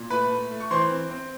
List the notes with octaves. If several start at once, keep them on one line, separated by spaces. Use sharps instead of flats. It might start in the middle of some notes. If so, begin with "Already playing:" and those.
Already playing: A#2
A3 B4 B5
A3
A3
C#6
E3 C5 C6
C4
C4